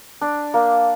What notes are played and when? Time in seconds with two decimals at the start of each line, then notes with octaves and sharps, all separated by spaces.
0.21 D4
0.54 A#3